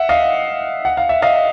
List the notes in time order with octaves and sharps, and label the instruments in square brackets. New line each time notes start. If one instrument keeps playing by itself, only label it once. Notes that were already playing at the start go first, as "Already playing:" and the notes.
Already playing: [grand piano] E5 F#5
D#5 F5
F#5
F5
E5
D#5 F5